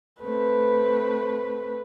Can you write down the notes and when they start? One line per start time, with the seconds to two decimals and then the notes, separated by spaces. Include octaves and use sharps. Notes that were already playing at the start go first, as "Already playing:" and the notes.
0.22 A3 C4 B4